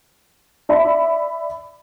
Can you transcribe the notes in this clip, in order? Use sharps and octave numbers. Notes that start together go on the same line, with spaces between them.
D5 E5 B5